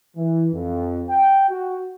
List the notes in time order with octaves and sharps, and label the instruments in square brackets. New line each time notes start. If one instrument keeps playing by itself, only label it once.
[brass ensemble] E3
F2
G5
F#4